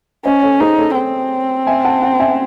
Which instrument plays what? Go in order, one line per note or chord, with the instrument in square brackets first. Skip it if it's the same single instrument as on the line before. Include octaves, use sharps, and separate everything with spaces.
[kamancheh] C#4 [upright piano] C5 D#5
[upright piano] A4 C#5
[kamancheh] D#4 [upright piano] G#4 C5
[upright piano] A4 C#5
[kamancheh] C4
[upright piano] E5 G#5
F#5 A5
F#5 A5
E5 G#5